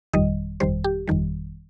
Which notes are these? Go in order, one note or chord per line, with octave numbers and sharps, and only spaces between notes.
G1 F2 D#3 G3 D#5
G1 F2 D#3 G3 C5
G4
G1 F2 D#3 G3